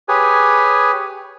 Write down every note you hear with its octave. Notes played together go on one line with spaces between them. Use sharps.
G4 G#4 B4 C#5 G#5